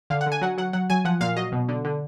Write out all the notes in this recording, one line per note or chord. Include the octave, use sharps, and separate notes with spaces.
D3 F5
F#5
D3
G#5
F#3 F#5
F#3 F#5
F#3 F#5
F#3 G#5
F3 F#5
A#2 F5
F#3 D#5
B2
D3
D3